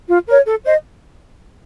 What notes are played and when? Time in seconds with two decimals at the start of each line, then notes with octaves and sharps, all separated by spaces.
0.09 F4
0.27 A#4 C#5
0.45 A4
0.64 C5 D#5